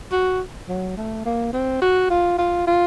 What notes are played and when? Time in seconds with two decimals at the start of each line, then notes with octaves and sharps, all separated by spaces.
0.12 F#4
0.68 F#3
0.97 A3
1.25 A#3
1.53 C4
1.82 F#4
2.10 F4
2.38 F4
2.67 F4